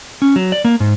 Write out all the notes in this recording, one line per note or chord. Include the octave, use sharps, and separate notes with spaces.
C#4
F#3
D5
A#3
G#2